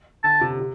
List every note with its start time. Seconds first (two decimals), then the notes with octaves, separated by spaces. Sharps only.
0.24 D3 A5
0.41 C3
0.60 C3